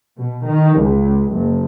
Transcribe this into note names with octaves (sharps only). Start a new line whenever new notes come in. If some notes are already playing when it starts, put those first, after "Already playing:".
B2
D#3
C#2
F#1